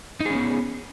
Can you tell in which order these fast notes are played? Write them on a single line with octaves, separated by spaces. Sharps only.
D#4 G#4 C#4 B3